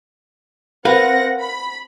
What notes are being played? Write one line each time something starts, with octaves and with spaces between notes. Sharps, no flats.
C4 A#4 B4 F5 F#5 A#6
B5